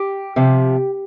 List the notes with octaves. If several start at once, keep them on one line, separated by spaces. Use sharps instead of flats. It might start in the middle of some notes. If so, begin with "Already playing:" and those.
Already playing: G4
C3 F3